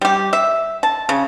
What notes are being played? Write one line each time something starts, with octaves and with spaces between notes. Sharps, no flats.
G3 G4
E5
A5
C#3